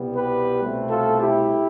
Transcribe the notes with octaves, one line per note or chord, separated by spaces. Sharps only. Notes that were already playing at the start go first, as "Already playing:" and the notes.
Already playing: C2 B2 G3 B3
G4 B4
C2 B2 A3 C4
F4 A4
E4 G4